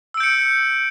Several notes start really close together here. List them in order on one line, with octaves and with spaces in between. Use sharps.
E6 D7 G6 C#7